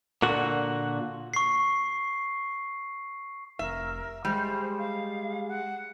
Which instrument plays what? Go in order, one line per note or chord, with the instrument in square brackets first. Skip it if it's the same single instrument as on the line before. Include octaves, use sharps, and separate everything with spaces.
[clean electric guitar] A#2 D3 F#4
[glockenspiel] C#6 C7
[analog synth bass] F1 [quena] A#4 [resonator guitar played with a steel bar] E5
[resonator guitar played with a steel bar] G3 [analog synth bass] G#3 [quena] C5
[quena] F5
F#5